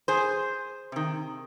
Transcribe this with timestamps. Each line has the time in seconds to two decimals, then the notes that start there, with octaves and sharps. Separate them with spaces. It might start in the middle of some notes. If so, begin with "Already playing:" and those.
0.08 G#4 C5
0.92 C3 D#3